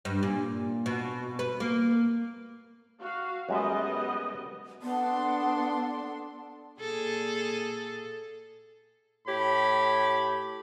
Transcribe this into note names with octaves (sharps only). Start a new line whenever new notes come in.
G2
A#2
B2
B4
A#3
F#4 F5
F#2 G3 G#3 B3 D#5 E5
B3 D4 A4 C6
A#2 G#4 A4
A2 G4 C#5 B5